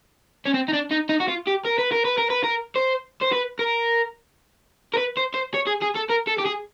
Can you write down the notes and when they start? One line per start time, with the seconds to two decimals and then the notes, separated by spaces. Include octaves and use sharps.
0.45 C#4
0.54 C4
0.68 D#4
0.73 D4
0.91 D#4
1.09 D#4
1.20 F#4
1.28 F4
1.47 G4
1.65 A#4
1.78 B4
1.92 A#4
2.05 B4
2.18 A#4
2.30 B4
2.44 A#4
2.76 C5
3.21 C5
3.32 B4
3.59 A#4
4.94 A#4
4.97 B4
5.17 C5
5.34 C5
5.54 C#5
5.67 G#4
5.82 G#4
5.95 A4
6.09 A#4
6.27 A4
6.38 G4
6.45 G#4